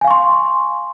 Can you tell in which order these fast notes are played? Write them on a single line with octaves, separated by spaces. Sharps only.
G#5 F5 C#6 C6